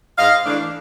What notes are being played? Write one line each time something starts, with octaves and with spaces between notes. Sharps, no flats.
G#2 D#5 F5
E3 A3 D4